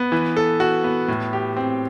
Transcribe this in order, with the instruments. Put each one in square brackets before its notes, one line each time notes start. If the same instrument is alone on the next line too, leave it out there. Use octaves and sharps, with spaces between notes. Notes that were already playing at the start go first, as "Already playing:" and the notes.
Already playing: [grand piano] B3
E3
A4
F#4
B3
A2
G4
C4